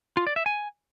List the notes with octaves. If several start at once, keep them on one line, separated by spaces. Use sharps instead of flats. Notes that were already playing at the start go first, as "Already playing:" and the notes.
F4
D5
E5
G#5